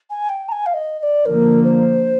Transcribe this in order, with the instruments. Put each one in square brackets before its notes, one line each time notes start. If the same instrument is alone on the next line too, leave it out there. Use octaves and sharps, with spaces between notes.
[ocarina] G#5
G5
A#5
G#5
F5
D#5
D#5
D5
[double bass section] D3 F3 A#3 [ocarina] A#4
[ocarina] C5